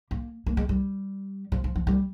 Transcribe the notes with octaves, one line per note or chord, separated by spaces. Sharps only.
A#3
A#3
G#3
G3
F3
F3
F3
G3